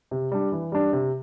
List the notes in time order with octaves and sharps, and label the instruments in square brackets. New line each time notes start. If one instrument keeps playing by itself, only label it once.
[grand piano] C3
G3 D4
E3
G3 D4
C3